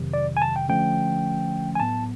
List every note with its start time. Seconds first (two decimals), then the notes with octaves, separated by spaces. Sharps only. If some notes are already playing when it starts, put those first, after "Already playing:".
Already playing: F2 C3 D#3 F#3
0.13 D5
0.37 G#5
0.42 A5
0.56 G5
0.69 D3 F3 A3 C#4 G5
1.75 G#5
1.80 A2 F#3 B3 A5